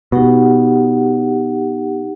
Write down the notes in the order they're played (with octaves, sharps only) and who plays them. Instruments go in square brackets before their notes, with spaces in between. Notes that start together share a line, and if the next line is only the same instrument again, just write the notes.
[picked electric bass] B2 [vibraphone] D#4 G4 F#5